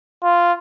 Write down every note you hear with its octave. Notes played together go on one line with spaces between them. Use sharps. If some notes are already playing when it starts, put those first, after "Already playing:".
F4